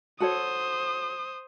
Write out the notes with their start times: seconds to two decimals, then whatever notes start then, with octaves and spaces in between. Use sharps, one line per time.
0.20 F#4 A4 C5 C#5 D#6